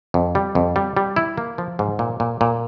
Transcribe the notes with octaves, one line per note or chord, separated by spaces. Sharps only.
F2
G3
F2
G3
G3
E4
A#3
F3
G#2
A#2
A#2
A#2